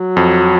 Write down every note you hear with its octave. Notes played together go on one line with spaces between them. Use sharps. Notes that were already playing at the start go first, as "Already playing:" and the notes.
Already playing: F#3
F2